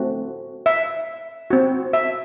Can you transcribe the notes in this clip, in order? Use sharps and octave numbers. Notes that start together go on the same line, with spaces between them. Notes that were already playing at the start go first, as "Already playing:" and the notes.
Already playing: A3 C4 F#4
E5
C4 F#4
E5